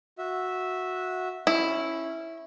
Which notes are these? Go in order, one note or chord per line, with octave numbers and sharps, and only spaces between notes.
F#4 E5
C#4 E4